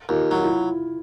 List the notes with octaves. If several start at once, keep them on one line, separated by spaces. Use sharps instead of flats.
D#2 F4
F#3 E4
F4
E4